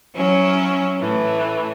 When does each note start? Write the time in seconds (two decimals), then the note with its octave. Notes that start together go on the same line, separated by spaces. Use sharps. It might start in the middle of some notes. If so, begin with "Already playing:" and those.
0.14 F#3 C#4 E4
0.99 A2 E3 A3